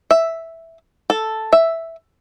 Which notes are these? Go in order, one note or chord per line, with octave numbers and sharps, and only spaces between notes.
E5
A4
E5